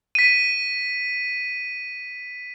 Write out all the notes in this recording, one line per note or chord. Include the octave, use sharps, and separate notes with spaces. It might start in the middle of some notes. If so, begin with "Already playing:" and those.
B6 D#7